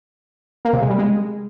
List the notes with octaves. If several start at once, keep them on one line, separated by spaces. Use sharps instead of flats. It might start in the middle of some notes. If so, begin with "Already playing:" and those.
A#3
C3
G#3
G3
G#3